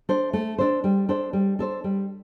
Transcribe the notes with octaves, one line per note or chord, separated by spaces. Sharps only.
D4 A4 C5
A3
D4 A4 C5
G3
D4 A4 C5
G3
D4 A4 C5
G3